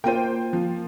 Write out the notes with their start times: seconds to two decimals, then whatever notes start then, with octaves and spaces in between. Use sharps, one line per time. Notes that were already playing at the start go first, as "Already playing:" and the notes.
0.04 A#3 F4 C5 G5 D#7
0.53 F3